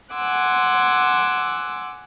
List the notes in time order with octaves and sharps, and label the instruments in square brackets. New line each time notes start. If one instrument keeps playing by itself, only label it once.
[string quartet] F#5 G#5 C6 D6 E6 F#6